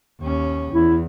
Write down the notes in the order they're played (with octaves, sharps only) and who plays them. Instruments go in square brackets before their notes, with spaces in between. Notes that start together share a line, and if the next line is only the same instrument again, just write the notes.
[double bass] D#2 C#4
[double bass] E2 [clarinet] E4